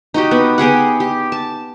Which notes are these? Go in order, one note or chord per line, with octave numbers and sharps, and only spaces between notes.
D#4 F#4 G4
B3
B3 G4 G#4 F#5
G4
A5